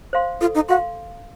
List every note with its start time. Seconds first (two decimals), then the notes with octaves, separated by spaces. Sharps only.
0.13 C5 F5 C6
0.41 F4 A4
0.55 D#4
0.69 F#4 F5 C6